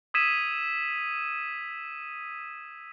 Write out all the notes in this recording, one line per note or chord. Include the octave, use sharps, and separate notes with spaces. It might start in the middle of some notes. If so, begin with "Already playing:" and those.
D#6 E6 G#6 B6 D#7 E7